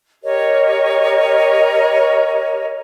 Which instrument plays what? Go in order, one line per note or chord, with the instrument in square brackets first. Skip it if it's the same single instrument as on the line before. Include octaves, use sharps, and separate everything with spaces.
[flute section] G4 A#4 C#5 D#5